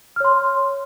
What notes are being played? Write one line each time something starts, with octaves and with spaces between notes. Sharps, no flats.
C#5 C6 F6